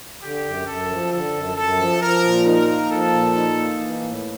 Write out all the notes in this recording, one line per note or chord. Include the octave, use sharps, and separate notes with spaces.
D3 G4
F#2
F#2 A4
F3
D3 A4
F#2
F#2 A4
F3
F3 A#4
A#2
D#4 A#4
A#3
F3 A4
A#2
D#4
A#3
E3
A2